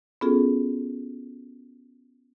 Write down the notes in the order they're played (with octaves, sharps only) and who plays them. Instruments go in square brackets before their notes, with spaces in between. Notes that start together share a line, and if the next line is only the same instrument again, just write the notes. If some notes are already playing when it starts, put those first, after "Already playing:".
[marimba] B3 C#4 F4 F#4 G#4 A4